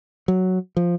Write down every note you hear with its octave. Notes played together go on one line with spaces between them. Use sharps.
F#3
F3